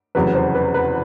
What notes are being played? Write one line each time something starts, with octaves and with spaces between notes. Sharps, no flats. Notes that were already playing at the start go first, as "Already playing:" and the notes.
F1 E2 C#3 F#3 B4
C5
B4
B4